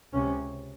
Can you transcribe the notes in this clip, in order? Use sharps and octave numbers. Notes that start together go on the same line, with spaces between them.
C#2 C3 C#4